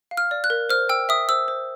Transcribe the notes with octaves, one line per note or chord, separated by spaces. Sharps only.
F5
F6
D5
F#6
A#4
C5 F6
G5 E6
E5 D#6
C5 E6
C5